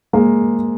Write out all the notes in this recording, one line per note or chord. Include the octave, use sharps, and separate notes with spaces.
G#3 A#3